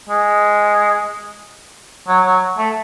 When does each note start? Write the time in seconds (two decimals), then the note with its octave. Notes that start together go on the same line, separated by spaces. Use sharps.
0.09 G#3
2.08 F#3
2.25 F#3
2.58 A3